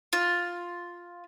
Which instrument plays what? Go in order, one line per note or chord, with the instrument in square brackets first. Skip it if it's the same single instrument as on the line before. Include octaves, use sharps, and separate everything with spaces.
[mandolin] F4